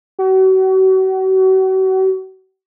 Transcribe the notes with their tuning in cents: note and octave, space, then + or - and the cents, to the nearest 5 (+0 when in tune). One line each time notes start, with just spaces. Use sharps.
F#4 +40